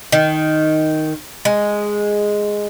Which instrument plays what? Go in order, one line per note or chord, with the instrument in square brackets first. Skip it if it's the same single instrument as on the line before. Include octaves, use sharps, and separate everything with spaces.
[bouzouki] D#3
G#3